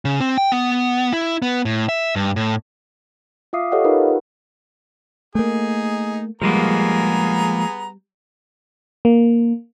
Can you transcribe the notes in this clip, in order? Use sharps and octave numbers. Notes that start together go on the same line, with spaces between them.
C#3
C4
G5
B3
E4
B3
A2
E5
G2
A2
F4 E5 F5 D6 D#6 C7
G4 A4 C#5 D#5 F5 F#5
D#4 F4 G4 A#4 B4
F#5
A3 A#3 D#4 G#4
F3 G3 G#3 A#3 B3 G#4 A#5
A#3